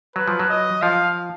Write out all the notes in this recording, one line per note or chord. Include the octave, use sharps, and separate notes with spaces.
F#3 B4
F3
F#3
D#5
F3 F5